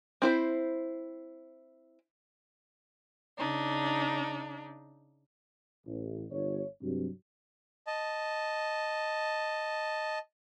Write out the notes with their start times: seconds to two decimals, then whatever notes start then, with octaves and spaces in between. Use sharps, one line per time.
0.22 C4 E4 C5
3.37 C#3 D4 D#4
5.87 A1
6.31 G1 C#5
6.82 G2 C3 F#3
7.87 D#5 A5